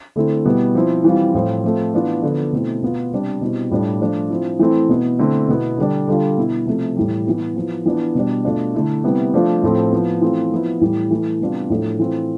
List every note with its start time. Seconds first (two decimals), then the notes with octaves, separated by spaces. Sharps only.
0.16 D3 A3 C4 E4
0.45 B2 G3 B3 E4
0.75 F3 C4 E4
1.04 E3 G3 C4 F4
1.34 A2 F3 C4 F4
1.64 F3 A3 C4
1.93 E3 B3 D4 F4
2.23 D3 F3 B3 D4
2.53 B2 A3 C4 E4
2.82 B2 B3 F4
3.12 C3 G3 D4
3.41 B2 G3 C4 E4
3.71 A2 G3 D4 F4
4.01 F3 A3 D4 F4
4.30 F3 C4 E4
4.59 E3 A3 C4 E4
4.89 B2 B3 E4
5.19 D3 A3 C4 E4
5.48 B2 B3 E4
5.78 D3 G3 D4
6.08 D3 G3 D4 F4
6.38 B2 B3 E4
6.66 C3 F3 A3
6.96 A2 E3 G3
7.26 E3 B3 E4
7.55 F3 B3 E4
7.86 E3 B3 D4 F4
8.15 B2 G3 D4
8.45 B2 A3 D4 F4
8.74 D3 A3 E4
9.04 C3 G3 B3 E4
9.34 F3 A3 D4 F4
9.63 A2 F3 A3 C4
9.92 F3 B3 E4
10.22 E3 A3 C4 F4
10.52 F3 B3 E4
10.81 A2 E3 G3
11.11 E3 A3 E4
11.40 C3 G3 B3 D4 F4
11.70 A2 F3 A3 D4
11.99 E3 A3 C4 F4